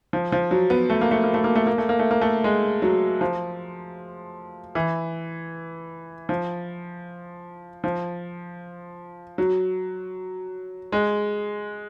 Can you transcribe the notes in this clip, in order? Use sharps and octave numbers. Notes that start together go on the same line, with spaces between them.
F3
F3
F#3
B3
A3
A#3
A3
A#3
A3
A#3
A3
A#3
A3
A#3
A3
A#3
A3
G#3
F#3
F3
E3
F3
F3
F#3
G#3